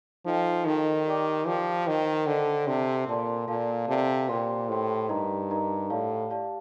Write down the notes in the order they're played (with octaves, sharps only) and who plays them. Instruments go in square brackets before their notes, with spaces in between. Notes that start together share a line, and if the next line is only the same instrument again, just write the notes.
[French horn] F3 [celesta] D#4 A4 D#5 G5
[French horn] D#3 [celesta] D#4 A4 D#5 G5
[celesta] G4 D5 G5 D6
[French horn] F3 [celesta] G4 D5 G5 D6
[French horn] D#3 [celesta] C5 D#5 G5
[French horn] D3 [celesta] C5 D#5 G5
[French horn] C3 [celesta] A4 D5 A5 C6
[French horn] A#2 [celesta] A4 D5 A5 C6
[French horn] A#2 [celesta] A4 D5 F5 A5
[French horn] C3 [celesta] A4 D5 F5 A5
[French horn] A#2 [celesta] G4 C5 G5 C6
[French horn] A2 [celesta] G4 C5 G5 C6
[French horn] G2 [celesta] D#4 G4 A#4 D#5 A#5
[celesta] D#4 G4 A#4 D#5 A#5
[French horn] A2 [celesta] G4 D5 F5 A5
[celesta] G4 D5 F5 A5